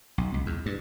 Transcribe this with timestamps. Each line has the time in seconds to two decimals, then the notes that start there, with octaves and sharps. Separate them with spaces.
0.18 B1
0.34 C#2
0.46 E2
0.66 G2